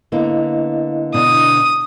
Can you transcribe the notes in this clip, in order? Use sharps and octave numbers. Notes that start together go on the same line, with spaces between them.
D3 A#3 B3 E4 D#5 F5
B2 D3 D4 D#6